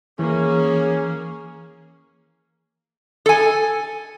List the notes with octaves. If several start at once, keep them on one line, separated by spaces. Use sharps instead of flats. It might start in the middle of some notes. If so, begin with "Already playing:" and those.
E3 A#3 C#4 G#4
A4 G#5